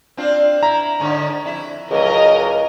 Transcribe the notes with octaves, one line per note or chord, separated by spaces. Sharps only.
C4 D4 F4
E4 A#5
G#2 D3 C#5
F2 E4 E5
C#2 A2 F#3 A#4 D#5